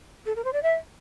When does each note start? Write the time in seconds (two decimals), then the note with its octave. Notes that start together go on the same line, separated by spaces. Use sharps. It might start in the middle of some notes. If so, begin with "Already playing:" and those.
0.26 A4
0.36 A#4
0.44 C5
0.53 D5
0.63 E5